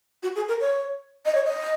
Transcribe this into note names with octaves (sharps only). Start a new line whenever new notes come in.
F#4
G#4
A#4
C#5
D#5
C#5
D#5